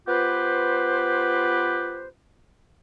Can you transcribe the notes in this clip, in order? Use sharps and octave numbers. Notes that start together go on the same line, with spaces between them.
B3 F4 G4 B4 C5